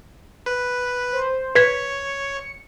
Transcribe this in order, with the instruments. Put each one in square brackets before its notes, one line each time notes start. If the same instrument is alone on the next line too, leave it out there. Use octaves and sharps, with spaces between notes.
[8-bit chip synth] B4
[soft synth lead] C5
[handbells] B4 G#6 B6 [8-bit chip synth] C#5 [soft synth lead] C#7